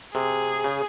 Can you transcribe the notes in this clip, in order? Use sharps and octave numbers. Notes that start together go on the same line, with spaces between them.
C3 G#4
C#3